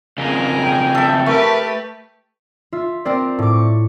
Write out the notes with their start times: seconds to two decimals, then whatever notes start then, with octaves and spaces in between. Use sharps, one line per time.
0.18 F2 C#3 G#4 A#4
0.61 G5
0.95 A4 E5
1.26 A3 G4 A#4 B4
2.72 F4 E5
3.05 C4 A#4 C5 D5
3.38 A2 D6
3.53 C#6